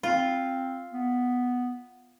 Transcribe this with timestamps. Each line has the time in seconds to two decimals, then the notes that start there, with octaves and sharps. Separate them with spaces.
0.03 C4 F4
0.93 B3